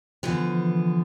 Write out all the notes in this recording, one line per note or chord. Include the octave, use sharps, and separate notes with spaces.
D3 E3 F3 B3